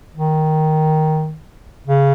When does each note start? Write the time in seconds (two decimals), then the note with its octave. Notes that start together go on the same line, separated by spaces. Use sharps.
0.15 D#3
1.87 C#3